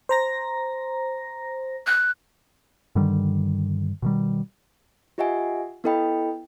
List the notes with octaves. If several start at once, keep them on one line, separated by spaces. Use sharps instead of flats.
C5 A#5 A#6
F#6
G2 D3 D#3 G3
B2 D#3 G3
F4 G4 D#5 E5 F#5 G#5
B3 E4 A4 D#5 G5 B5